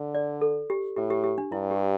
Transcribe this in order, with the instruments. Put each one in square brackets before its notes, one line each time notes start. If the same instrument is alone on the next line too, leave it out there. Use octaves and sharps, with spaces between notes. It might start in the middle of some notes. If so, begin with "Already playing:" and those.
Already playing: [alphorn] D3
[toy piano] D5
A4
G4
[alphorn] A2 [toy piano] G4
[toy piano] G4
G4
D4
[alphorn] G2 [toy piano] E4
[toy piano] G4